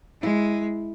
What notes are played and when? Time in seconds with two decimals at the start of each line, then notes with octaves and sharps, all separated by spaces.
0.22 G#3 E4